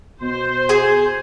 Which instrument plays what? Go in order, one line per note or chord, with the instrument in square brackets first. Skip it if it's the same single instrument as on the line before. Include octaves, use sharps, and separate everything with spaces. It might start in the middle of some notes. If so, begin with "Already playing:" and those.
[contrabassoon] B2 [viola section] C5
[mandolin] G#4